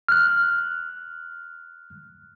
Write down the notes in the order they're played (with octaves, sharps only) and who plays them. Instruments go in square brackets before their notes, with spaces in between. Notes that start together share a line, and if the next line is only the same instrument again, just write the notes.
[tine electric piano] F6 F#6